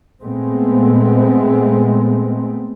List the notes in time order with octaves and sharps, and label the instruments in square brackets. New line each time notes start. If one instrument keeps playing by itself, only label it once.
[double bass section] A#2 G#3 A3 B3 C4